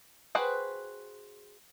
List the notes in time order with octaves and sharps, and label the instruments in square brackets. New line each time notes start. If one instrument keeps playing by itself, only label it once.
[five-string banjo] F#4 G#4 B4 C5 G5